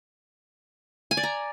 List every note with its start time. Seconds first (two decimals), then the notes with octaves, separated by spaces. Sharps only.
1.11 G#5
1.17 D5
1.23 A#5